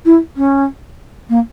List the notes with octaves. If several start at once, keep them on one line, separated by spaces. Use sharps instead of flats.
E4
C#4
A#3